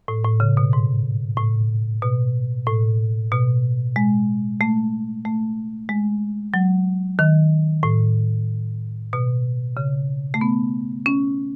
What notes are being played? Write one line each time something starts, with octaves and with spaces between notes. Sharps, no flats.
A2
A2
C#3
B2
G#2
A2
B2
A2
B2
G#3
A3
A3
G#3
F#3
D#3
A2
B2
C#3
A3
B3
C#4